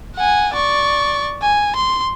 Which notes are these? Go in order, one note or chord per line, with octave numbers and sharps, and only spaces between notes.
F#5 G#5
D5 C#6
G#5
C6